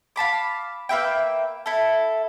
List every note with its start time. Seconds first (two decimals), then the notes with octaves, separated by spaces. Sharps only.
0.16 F5 A5 B5 D6
0.89 A#3 B4 E5 G5
1.66 E4 A4